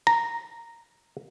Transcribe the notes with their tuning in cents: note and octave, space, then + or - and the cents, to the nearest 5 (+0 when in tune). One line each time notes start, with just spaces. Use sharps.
A#5 -5